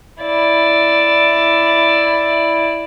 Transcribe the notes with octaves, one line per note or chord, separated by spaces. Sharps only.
E4 D5